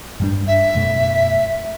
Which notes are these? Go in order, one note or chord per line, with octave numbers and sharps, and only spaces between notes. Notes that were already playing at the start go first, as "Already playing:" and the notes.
G2 G3 D4
E5
F#2 B2 A3